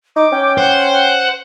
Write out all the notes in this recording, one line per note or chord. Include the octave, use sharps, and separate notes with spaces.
D#4 D6
C#4 G5
C5 F#5
F#5